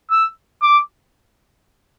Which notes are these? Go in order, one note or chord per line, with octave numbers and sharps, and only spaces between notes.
E6
D6